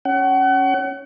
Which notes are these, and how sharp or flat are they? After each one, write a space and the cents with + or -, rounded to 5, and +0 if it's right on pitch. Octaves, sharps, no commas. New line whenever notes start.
C#4 +0 F#5 +35